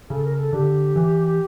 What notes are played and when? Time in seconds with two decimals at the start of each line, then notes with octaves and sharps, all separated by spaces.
0.09 C#3 A4
0.24 A#4
0.36 A4
0.53 D3 G4
0.96 E3